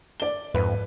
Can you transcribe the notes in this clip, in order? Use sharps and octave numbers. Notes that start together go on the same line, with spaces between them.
D5 G7
F2 G#2 B4